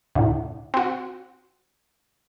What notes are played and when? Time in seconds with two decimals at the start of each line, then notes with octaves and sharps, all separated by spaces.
0.15 D2 A2
0.74 C4 F#4